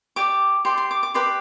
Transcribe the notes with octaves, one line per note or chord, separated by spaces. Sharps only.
G4 D5 D6
G4 D5 C6
C6
D6
D6
G4 B4 D5 C6